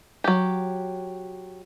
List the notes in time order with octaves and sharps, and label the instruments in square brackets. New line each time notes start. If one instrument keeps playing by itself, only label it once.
[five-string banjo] F#3 G4